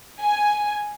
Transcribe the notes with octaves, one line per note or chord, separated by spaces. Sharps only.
G#5